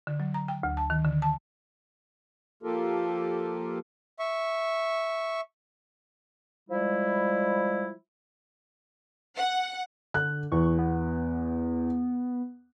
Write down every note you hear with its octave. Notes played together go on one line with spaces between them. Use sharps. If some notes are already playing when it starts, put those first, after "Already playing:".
D3
F#3
A#5
G5
D2
A5
D#3
D3
A5
F3 A#3 F4 G4 A4 A#4
E5 C#6
F3 G3 G#3 E4
F#5
D3 F#6
E2 C#6
B3